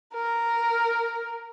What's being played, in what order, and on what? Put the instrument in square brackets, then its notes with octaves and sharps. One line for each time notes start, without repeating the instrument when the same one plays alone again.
[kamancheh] A#4